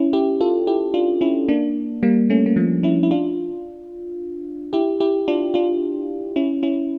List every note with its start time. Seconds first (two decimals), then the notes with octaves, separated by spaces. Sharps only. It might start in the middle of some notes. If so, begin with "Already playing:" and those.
Already playing: C#4 E4
0.13 E4 G4
0.41 F4 A4
0.67 E4 G4
0.94 D4 F4
1.21 C#4 E4
1.48 A#3 D4
2.03 G3 A#3
2.30 A3 C#4
2.46 A#3
2.56 F3 A3
2.83 C#4 E4
3.03 E4
3.11 D4 F4
4.73 E4 G4
5.00 E4 G4
5.28 D4 F4
5.54 D4 F4
6.36 C#4 E4
6.63 C#4 E4